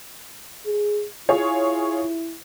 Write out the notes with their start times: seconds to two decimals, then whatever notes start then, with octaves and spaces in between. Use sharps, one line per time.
0.66 G#4
1.29 E4 F4 G#4 C#5